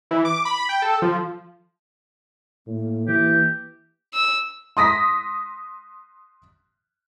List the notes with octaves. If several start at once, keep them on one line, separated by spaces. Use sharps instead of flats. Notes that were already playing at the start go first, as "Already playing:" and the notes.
E3
D6
B5
G5
A4
F3
A2 A#3
E3 G4
E6
C6 D#6 A#6 B6